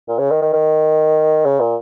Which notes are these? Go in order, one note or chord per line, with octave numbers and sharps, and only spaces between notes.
A#2
C#3
D#3
D#3
D#3
C#3
A#2